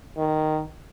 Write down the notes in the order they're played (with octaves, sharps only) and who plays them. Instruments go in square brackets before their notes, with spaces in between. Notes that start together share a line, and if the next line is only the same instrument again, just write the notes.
[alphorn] D#3